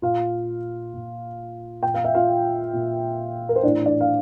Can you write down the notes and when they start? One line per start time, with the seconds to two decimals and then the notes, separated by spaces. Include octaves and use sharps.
0.02 A#2 F4 F5
0.94 A#2
1.83 A#2 G5
1.94 F5
2.04 E5
2.14 F4 F5
2.73 A#2
3.49 A#4
3.56 C5
3.63 A2 E3 D4 D5
3.86 D4 D5
4.00 F5